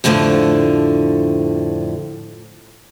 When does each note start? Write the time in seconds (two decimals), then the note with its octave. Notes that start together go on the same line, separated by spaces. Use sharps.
0.04 F2 A2 D3 D#3 F3